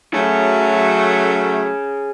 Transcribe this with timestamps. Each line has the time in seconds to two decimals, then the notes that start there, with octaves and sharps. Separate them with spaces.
0.14 F#3 A3 G#4 C#5